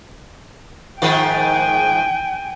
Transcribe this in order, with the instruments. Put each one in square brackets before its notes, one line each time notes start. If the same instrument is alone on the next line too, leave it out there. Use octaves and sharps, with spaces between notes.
[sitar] G#2 D#3 F3 [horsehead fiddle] G5 G#5